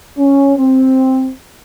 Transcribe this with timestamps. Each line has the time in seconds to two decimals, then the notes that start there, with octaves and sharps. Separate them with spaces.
0.18 C#4
0.57 C4